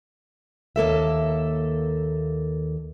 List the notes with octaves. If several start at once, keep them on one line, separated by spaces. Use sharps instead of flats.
D#2 A#3 A4 E5